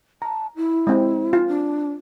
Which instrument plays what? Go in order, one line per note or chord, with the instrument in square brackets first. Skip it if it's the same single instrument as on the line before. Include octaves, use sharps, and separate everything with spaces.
[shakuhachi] A5 [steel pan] A#5
[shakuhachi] E4
[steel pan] G#3 C4
F4
[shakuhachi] D4